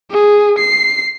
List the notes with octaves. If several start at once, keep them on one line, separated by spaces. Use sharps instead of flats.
G#4
C7